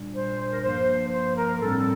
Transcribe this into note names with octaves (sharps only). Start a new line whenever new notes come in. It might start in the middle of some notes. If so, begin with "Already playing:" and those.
Already playing: A#2 G3 D4
C5
A#4
G2 F3 A#3 D4 C5
C5
A#4
A2 G3 C4 A4